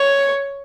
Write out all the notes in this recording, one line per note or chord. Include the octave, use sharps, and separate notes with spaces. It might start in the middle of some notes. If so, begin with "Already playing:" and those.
Already playing: C#5